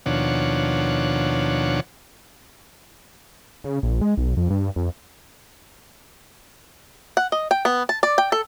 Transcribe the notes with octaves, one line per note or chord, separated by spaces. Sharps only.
D#2 B2 F3 D4 C#5 F#5
C#3
A#1
G#3
B1
F2
G2
F2
F#5
D#5
G5
B3
A5
D5
G5
A4